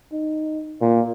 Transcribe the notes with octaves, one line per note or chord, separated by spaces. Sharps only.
D#4
A#2